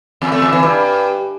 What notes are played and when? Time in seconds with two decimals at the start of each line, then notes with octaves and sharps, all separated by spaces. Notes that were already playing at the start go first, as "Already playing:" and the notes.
0.22 E2
0.32 A3
0.42 E2
0.53 E3
0.63 G2